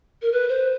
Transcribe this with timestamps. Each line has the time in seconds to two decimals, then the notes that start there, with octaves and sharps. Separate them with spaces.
0.22 A#4
0.32 B4
0.48 C5